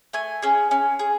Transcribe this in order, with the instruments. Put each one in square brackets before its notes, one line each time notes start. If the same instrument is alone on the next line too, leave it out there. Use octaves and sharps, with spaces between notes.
[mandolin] A3 G#5
C#4 G#4
C#4
G#4